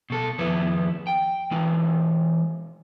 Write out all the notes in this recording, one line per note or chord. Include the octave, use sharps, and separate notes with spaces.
B2 A4
F2 D#3 B3 E4 B4
G5
E3 G#3 D#4